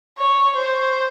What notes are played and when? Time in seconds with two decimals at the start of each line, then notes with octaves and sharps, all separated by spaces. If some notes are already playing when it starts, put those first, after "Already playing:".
0.18 C#5
0.56 C5